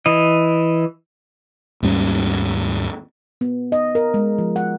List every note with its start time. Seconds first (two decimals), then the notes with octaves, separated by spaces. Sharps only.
0.06 E3 D#5
1.82 D#2 G#2 G3 C#4
3.41 B3
3.72 D#5
3.95 A#4
4.14 G#3
4.39 F3
4.56 F#5